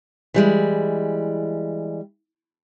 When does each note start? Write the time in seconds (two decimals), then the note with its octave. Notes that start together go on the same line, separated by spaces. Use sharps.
0.34 E3 G3 G#3